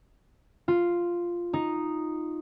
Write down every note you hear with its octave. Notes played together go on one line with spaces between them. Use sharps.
F4
D#4